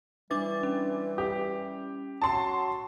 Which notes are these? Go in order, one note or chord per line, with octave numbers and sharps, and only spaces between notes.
E3 G3 D4 D6 A6
C#4
G4
F#3 F#4 A5 C6